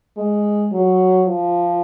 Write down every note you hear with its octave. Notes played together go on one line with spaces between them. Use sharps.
G#3
F#3
F3